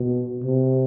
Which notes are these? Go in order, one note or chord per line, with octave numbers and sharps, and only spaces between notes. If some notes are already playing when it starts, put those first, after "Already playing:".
Already playing: B2
C3